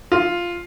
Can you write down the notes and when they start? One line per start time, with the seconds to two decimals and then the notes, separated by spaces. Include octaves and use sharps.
0.12 F4